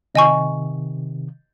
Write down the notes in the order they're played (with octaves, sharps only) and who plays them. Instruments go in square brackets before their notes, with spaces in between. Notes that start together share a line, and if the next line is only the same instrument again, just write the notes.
[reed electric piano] C3 D#3 [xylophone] D#5 G#5 C#6